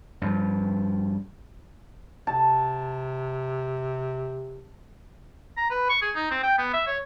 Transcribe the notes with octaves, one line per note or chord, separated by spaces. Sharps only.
G2 F3
C3 A5
A#5
B4
C#6
G#4
D#4
C4
G5
B3
E5
C#5